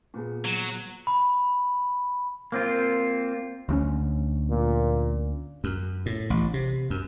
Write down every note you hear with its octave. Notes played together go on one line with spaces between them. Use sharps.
A#2 B3 G#4
F#3
B5
A#3 C4 F4
D2 A3 C#4
A#2
F#2
A2
A1
C3
F#2